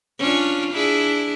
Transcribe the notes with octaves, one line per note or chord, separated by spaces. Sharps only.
C#4 D4 F4
D4 E4 G#4